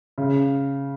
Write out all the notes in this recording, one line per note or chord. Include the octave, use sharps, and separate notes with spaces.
C#3